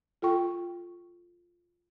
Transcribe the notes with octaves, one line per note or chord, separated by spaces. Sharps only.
F4 A4 G5 C#6